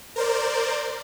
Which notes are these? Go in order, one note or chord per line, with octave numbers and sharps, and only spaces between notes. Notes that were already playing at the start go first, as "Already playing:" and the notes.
A#4 C5 D5